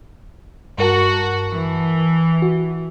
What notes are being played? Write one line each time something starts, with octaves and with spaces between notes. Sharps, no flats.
G2 F#4 A#4 A5
E3
F#4